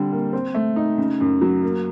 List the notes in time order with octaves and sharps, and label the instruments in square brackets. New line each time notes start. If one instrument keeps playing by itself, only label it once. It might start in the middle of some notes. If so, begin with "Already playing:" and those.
Already playing: [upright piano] D3 G3 C4
A#3
C4
A3
D#4
C#3
F#2
F#3
A#3